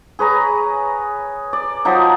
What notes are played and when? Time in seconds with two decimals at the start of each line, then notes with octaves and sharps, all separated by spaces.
0.19 G#4 B4 C#5 A#5
1.53 D5
1.85 F3 F#3 D#4